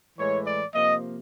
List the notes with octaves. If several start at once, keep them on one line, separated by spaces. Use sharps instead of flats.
A2 E3 G#3 C#5
D5
C3 F3 A#3 D#5